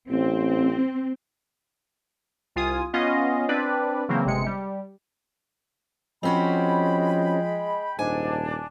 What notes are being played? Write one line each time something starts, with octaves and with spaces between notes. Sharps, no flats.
A1 C4
C2 F4 G#5 D#6
B3 C#4 F4 D#5 F5
C4 D4 B4 D5
C#3 E3 F#3 A#3 C4
G1 C3 G#3 C#7
G3
F3 G#3 C4 C#4 F#4 G5 B5
D#1 G#2 D4 G#5